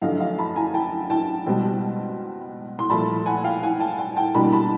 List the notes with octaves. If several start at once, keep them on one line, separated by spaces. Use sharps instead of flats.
F#2 D3 F3 A3 D#5 F5
D#5 F5
A5 B5
G#5 A#5
G5 A5
G5 A5
C#2 B2 G3 C4
C6
C2 A#2 F3 A3 A5 B5
F#5 G#5
F5 G5
F#5 G#5
G5 A5
G5 A5
G5 A5
C2 B2 G3 A#3 D4 A5 B5
A5 B5